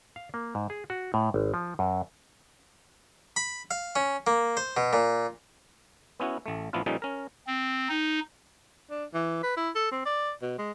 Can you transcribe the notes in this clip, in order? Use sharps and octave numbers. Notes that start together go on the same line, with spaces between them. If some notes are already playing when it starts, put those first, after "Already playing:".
F5
A#3
G#2
G#4
F#4
A2
G#1
F3
F#2
B5
F5
C#4
A#3
C5
B2
A#2
B3 C#4 E4 F#4
A1 A3
A1 F3 B3 D4 E4 F4
A#2 F3 G3 C#4 D#4 A4
C#4 A#4
C4
D#4
D4
E3
B4
E4
A4
C4
D5
B2
G#3